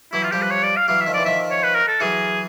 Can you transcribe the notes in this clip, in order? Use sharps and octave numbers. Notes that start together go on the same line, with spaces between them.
E3 F#3 E4
F4
F3 G3 G4
B4
C#5
D5
F5
E3 F#3 F5
E5
D#3 F3
E3 D5
D#3 F3 E5
C#5
B4
A#4
A4
E3 F#3 G#4